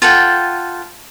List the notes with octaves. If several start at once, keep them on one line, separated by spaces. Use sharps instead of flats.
F4 A4 F#5 G5